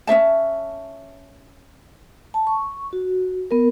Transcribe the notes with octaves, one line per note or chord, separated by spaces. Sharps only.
C#4 D4 E5 A5
A5
C#6
F#4
B3 A#4